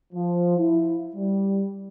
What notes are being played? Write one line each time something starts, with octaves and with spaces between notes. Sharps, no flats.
F3
E4
G3